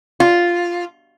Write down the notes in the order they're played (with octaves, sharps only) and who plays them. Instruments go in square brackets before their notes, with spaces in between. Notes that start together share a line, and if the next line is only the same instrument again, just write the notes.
[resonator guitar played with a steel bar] F4